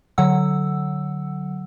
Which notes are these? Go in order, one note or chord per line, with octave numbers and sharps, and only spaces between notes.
D3 F#3 F#5 E6